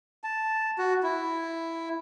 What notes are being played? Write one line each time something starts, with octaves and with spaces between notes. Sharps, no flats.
A5
F#4
E4